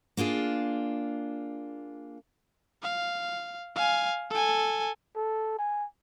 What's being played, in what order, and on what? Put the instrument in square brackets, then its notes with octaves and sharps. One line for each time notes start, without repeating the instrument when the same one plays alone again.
[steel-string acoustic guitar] A#3 D4 F4 G#4
[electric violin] F5
F5 G#5
A4 G#5
[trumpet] A4
G#5